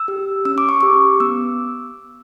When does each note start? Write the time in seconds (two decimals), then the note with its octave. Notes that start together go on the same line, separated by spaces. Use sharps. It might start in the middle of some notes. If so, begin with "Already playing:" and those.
Already playing: E6
0.08 G4
0.45 C#4 E6
0.58 D6
0.69 C#6
0.81 G4 D6
1.20 B3 E6